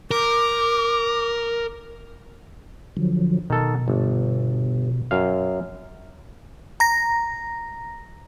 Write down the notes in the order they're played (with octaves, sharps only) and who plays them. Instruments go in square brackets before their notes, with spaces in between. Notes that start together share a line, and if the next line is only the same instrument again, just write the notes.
[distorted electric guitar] A#4 [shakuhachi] D6
[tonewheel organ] D3 F3 F#3
[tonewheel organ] B2 [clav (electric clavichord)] D#3 A4
[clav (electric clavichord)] G1
F#2 F5
[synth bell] A#5 A#6